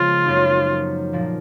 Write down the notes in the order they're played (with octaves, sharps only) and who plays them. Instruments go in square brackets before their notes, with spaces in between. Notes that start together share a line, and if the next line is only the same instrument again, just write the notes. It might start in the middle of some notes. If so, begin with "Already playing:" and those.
Already playing: [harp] C#3 F3 G#3 B3 [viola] F4
[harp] F#2 F3 A#3 D#4
A#2 F3 A#3